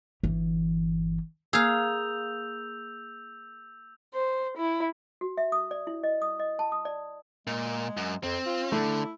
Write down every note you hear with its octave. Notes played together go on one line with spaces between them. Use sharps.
G1 E3
A#3 G#4 F5 E6 G6 F7
C5
E4
F#4
E5
D#6
D5
E4
D#5
D#6
D#5
A5
D#6
D5
A#2 G#3
F#2
F2 C4
F4
D3 A3 E4